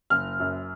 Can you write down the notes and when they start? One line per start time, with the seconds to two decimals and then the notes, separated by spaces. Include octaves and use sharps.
0.10 F#1 F6
0.40 F#2